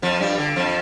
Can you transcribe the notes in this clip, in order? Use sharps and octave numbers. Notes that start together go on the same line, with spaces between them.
F2 F3
G2 G3
D3
F2 F3